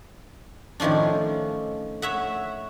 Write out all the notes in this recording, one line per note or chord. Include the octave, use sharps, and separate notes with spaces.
A2 D#3 F3 C#4 D4
C#5 E5 F#5